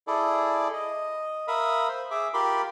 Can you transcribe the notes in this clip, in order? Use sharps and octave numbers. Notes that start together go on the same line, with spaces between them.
E4 G#4 A4 D5
D#5
A#4 E5 F5 B5 D#6
C5
G#4 E5 D6
F4 G4 A#4 B5 C6 D6